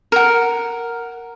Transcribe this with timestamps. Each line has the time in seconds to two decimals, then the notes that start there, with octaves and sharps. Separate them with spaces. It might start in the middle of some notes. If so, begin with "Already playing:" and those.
0.12 A#4 F#5